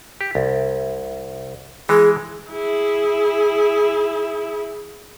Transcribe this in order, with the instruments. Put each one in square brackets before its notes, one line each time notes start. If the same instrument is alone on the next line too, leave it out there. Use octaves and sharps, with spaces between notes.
[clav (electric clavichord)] G4
C2
[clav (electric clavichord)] E3 G#3 [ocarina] G#4
[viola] E4 G#4